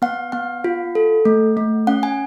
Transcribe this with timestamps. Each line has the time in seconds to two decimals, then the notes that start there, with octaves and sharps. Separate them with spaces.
0.02 B3 F#5
0.32 B3 F#5
0.64 F4
0.95 A4
1.25 A3
1.57 A3
1.87 C#4 F#5
2.03 G#5